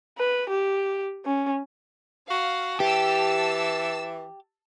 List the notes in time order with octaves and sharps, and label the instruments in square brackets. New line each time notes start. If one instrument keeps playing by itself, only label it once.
[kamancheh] B4
G4
C#4
[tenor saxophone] F#4 [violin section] F5
[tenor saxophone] E3 [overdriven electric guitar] G4 [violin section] A5 E6